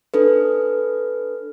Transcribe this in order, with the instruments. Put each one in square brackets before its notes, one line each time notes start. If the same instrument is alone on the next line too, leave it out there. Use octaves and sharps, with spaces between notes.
[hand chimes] D4 A4 B4